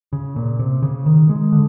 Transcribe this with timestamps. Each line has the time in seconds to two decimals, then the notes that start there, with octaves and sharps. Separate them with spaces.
0.13 C#3
0.36 A#2
0.59 C3
0.83 C#3
1.06 D#3
1.29 G#3
1.52 D3